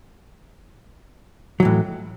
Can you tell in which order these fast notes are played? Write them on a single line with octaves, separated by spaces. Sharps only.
F#3 E3 A2